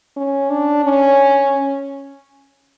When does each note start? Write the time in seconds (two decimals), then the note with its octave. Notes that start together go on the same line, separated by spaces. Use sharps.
0.17 C#4
0.50 D4
0.84 C#4